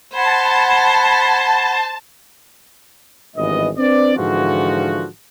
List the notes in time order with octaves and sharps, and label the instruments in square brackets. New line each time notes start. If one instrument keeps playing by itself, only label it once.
[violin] C5 [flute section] F#5 B5 G#6 [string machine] A5
[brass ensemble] G#1 G2 E3 B3 D#5
C4 D4 B4 D5
G#2 D3 E3 F3 F4 F#4